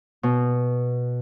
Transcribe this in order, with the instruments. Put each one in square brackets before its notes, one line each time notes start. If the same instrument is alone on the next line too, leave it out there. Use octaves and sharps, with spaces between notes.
[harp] B2